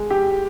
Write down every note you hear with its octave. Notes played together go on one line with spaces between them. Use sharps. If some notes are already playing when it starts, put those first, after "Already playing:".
Already playing: G#3
G4